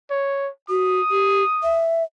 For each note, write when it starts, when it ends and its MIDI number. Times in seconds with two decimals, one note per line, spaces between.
0.10 0.49 73
0.70 1.00 66
0.70 1.84 87
1.11 1.43 67
1.63 2.03 76